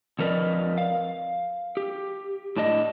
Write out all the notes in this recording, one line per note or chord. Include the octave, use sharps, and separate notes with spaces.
F2 F3 A#4 B4 D5 D#5
F5
G4
A2 D4 D#5